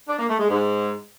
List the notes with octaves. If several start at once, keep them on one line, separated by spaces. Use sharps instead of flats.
D4
A#3
A3
G#3
G#2